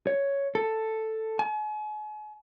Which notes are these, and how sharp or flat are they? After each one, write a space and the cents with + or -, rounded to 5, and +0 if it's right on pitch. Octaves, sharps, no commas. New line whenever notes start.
C#5 +5
A4 +5
G#5 +40